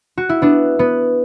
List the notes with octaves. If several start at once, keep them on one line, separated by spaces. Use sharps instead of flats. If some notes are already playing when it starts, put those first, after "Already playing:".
F#4
E4
B3 D4
B3